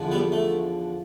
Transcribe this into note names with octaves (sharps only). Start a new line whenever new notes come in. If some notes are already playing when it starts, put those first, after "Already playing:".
Already playing: E2 D3 F3
G3 B3
A3